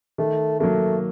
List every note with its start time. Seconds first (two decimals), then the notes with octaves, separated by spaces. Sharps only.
0.18 D#3 A3
0.59 F#3 A3 A#3